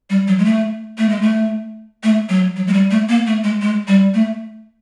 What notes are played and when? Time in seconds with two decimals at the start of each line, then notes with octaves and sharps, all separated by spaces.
0.10 G3
0.28 F#3
0.39 G#3
0.45 A3
0.98 A3
1.09 G#3
1.22 A3
2.03 A3
2.29 F#3
2.56 F#3
2.67 G#3
2.73 G3
2.91 A3
3.09 A#3
3.27 A3
3.44 G#3
3.62 G#3
3.88 G3
4.14 A3